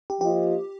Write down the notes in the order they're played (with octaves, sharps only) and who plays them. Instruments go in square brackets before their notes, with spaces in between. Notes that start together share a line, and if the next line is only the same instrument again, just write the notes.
[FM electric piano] G4
[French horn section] F3 A#3 F4 C5 D#5 [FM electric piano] G4